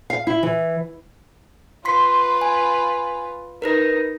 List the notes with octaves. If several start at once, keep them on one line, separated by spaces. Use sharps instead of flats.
F5
E4
E3
F4 B4 C6 B6 C7
G#5
D#4 A#4 B4 A#6